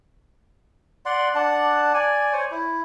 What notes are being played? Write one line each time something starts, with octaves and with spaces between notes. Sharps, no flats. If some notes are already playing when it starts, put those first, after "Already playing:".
D5 F#5 C6
D4 F#5 A5
D5 G#5
C5 C#5
E4